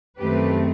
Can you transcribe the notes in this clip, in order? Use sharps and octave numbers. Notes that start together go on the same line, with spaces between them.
F#2 D#3 A3 C4 G4 B4